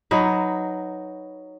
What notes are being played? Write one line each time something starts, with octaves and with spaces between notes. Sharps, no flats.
F#3 D#4 B4